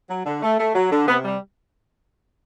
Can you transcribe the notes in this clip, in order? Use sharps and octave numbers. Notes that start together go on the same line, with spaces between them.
F#3
D3
A3
A3
F#3
D3
C3 B3
G3